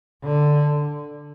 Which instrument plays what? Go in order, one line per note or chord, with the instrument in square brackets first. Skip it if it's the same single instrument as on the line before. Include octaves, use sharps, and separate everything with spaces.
[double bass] D3